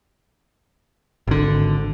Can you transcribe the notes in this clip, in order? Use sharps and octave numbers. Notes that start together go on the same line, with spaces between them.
G#1 D3